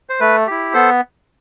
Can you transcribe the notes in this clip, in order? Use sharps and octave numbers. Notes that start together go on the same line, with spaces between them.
C5
A3 B4
E4 G4
B3 A4 C5